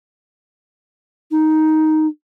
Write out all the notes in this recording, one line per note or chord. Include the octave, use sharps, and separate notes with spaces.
D#4